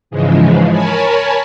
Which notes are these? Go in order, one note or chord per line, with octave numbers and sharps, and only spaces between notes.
G#2 C#3 E3 F3 G#3
A#4 C#5 G#5 A5 B5